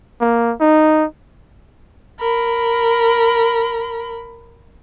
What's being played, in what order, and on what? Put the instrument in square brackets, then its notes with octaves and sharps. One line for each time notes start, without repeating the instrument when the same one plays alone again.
[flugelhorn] A#3
D#4
[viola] A#4 B5